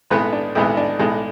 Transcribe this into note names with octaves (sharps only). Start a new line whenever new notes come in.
B1 A2 G#3 B3 B4
D4
B1 A2 G#3 B3 E4
D4
B1 A2 G#3